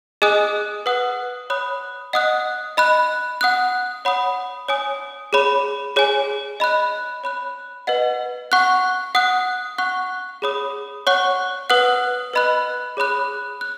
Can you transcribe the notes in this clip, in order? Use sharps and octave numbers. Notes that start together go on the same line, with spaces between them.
G#4 D#5 G#5 D#6 F#6
B4 F#5 D#6 F#6
C#5 B5 D#6 F#6
D#5 F#5 D#6 F#6
D#5 B5 F#6
F#5 D#6 F#6
C#5 F#5 B5 D#6
C#5 G#5 D#6
G#4 C#5 B5
G#4 C#5 G#5
D#5 B5 F#6
C#5 B5 F#6
B4 D#5 F#5
F#5 C#6 F#6
F#5 D#6 F#6
F#5 C#6 F#6
G#4 C#5 B5 D#6
C#5 F#5 C#6 F#6
B4 F#5 D#6 F#6
B4 D#5 B5 F#6
G#4 C#5 B5 D#6 F#6
F#6